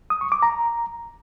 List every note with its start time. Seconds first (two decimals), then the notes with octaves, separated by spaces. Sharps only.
0.10 D#6
0.21 C#6
0.32 D6
0.43 A#5